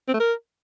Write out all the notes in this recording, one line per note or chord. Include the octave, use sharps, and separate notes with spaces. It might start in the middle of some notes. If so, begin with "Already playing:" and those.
C4
A3
A#4